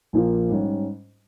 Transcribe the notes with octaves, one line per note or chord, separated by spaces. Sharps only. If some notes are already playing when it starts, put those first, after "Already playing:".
A#1 A#2 F3 A#3 F4
G#2 G3 C#4